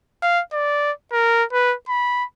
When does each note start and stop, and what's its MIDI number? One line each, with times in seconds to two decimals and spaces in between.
0.22 0.41 77
0.53 0.91 74
1.12 1.44 70
1.52 1.75 71
1.88 2.24 83